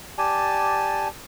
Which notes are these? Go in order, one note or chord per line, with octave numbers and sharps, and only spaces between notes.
G4 D5 G#5 A5